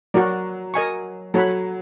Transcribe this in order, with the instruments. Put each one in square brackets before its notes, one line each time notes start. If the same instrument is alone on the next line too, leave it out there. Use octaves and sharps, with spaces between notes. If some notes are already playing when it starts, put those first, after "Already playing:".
[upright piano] F#3 [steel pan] F#4 A#4 D5
[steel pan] A#4 D#5 G#5 C#6
[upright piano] F#3 [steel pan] A4 C#5 F#5 B5